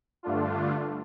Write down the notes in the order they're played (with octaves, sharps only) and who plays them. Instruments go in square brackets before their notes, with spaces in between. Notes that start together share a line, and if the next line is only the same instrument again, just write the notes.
[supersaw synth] G2 D3 A3 D4 F4